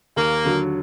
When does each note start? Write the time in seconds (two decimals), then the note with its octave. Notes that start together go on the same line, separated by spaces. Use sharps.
0.16 D#2 A#3
0.45 D3 F#3